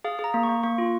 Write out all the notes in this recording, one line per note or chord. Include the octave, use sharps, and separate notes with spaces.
G#4 F5
G#4
A#5
A#3
C#6
A#3
A#3 C#6
F4